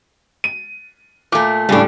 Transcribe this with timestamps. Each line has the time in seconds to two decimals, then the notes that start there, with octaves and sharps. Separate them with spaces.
0.44 D#7
1.32 A#2 A3 D6
1.69 A2 C#3 G3 D4